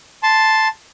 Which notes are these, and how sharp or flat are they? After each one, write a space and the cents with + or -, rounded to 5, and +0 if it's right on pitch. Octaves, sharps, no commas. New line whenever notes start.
A5 +0 C6 +0